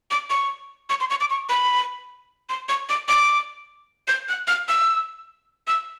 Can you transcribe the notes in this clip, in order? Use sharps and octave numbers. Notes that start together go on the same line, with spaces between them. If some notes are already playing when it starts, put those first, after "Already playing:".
D6
C#6
C#6
C6
C#6
D6
C#6
B5
C6
C#6
D6
D6
G6
F#6
F6
E6
E6